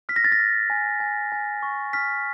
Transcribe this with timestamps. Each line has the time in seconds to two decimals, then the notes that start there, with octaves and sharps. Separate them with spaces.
0.09 F6 B6
0.16 A#6
0.24 A6
0.32 A#6
0.39 F6
0.70 G#5
1.00 G#5
1.32 G#5
1.63 C#6
1.93 F6 B6